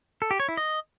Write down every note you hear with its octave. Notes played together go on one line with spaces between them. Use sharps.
A4
G4
C#5
E4
D#5